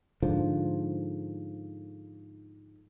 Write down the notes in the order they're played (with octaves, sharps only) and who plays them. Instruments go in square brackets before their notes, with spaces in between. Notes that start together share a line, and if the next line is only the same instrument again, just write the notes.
[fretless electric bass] G#2 D3 F3